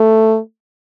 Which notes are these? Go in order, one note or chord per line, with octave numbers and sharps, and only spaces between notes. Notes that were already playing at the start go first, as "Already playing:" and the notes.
Already playing: A3